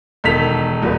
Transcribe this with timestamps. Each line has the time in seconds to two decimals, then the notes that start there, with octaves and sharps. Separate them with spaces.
0.24 E1 D#3 A4 B6 F7
0.82 D#1 E2 B4